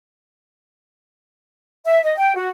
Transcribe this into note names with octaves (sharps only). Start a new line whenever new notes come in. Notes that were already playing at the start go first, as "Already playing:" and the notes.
E5
D#5
G5
F#4